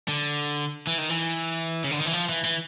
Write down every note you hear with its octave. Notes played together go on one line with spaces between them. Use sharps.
D3
E3
D#3
E3
C#3
D3
D#3
E3
F3
E3
E3